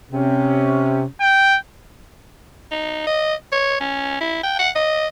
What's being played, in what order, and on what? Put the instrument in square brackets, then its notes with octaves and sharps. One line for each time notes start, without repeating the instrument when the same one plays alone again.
[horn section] C3 C#4
[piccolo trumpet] G5
[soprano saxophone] D#4
D#5
C#5
C#4
E4
G5
F#5
D#5